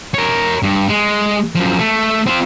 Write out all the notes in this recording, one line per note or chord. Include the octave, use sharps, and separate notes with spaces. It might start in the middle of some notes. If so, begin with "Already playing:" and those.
A#4 C#5
G2
G#3
F#2 F3
A3
C4 F4